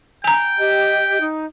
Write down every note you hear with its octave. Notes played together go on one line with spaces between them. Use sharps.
G5 G#5 A#5
G4 D#5
D#4